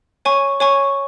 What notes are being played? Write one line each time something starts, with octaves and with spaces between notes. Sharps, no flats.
C#5 G#5 C#6
C#5 G#5 C#6